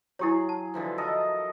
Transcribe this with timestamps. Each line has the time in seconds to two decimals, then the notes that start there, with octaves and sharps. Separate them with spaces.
0.19 F#3 E4 G4 G#4 C#5
0.49 A5
0.74 D3 E3 F3
0.98 A4 A#4 D#5